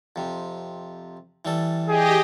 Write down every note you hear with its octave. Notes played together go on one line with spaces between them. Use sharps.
F2 C3
E3 G3 A4
G4 G#4 D#5